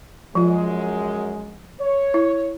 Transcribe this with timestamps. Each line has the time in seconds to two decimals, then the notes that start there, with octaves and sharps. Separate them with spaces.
0.35 F#2 F3 G#3 F4
1.80 C#5
2.14 E4